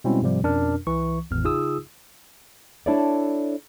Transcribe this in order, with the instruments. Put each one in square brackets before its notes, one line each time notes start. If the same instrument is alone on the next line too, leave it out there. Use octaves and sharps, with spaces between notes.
[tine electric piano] B2 G3 G#3 C4 C#4 E4
G#2 C3 F3 G3
F2 B2 C#4 D4 A#4 F6
C2 E3 C#6
G#1 E2 A2 F6
C#3 D#4 F4 G#4 D#6 E6
[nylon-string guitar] D4 E4 A4 C#5 D5